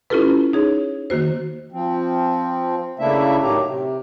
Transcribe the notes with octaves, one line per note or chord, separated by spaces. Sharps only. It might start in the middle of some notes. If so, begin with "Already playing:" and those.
C#4 E4 F4 G4 A4 B4
D#4 G#4 C#5
D#3 A#3 F#4 C5
F3 C4
C#3 A3 A#3 D4 E4 E5
A2 D#3 F#3 G4 A#5
C3